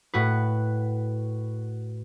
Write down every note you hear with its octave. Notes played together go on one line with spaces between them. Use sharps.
A2 F#4 B4